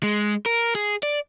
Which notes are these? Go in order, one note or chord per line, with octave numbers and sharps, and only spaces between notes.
G#3
A#4
G#4
D5